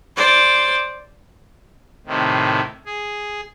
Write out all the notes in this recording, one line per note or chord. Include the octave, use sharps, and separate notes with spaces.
C5 D5
A2 C3 D#3
G#4